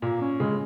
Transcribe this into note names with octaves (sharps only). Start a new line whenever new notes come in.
A#2 A#3
C#4
C#3 G#3